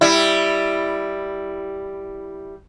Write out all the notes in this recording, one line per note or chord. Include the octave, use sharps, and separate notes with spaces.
G3 E4